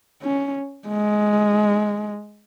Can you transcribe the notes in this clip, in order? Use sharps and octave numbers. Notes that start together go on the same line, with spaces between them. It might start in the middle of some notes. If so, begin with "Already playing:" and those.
C#4
G#3